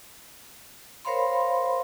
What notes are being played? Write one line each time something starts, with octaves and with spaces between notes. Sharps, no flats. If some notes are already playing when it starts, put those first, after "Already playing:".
A#4 C5 C#5 F5 B5 C6